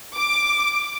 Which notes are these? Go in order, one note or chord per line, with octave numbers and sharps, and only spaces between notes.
D6